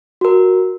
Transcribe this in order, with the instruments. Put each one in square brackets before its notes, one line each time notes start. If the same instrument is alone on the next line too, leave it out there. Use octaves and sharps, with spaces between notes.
[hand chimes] F#4 A#4